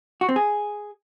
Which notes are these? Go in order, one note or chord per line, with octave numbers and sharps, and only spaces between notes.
F#4
C4
G#4